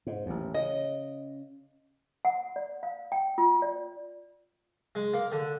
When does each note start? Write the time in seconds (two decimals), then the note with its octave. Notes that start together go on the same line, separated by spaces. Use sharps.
0.07 G#2
0.26 A1 D#2
0.54 C#3 D#5
2.25 F#5
2.56 D5
2.83 F5
3.12 G5
3.38 F4
3.62 D5
4.95 G#3
5.14 A#3
5.32 D3